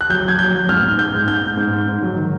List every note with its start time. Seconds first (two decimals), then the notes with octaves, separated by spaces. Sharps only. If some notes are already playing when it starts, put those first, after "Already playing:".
0.01 F#6
0.09 F#3 G6
0.25 F#3 G#6
0.39 F#3 G6
0.54 F#3
0.69 G#2 F6
0.83 G#2
0.98 G#2 G6
1.14 G#2
1.28 G#2 G6
1.43 G#2
1.57 G#2
1.73 G#2
1.88 G#2
2.03 F#3
2.17 D#3